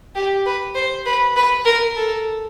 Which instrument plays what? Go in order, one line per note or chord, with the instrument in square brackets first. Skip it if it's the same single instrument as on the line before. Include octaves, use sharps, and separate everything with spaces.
[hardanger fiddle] G4
B4
C5
B4
B4
A#4
A4